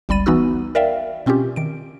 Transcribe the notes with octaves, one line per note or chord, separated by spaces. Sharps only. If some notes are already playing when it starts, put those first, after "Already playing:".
G1 C#2 G3 B5 A6 D#7
E3 B3 D#4 F#4 E6
A#4 D5 E5 F5 G5
B2 C4 C#4 F4 G4
D#3 D7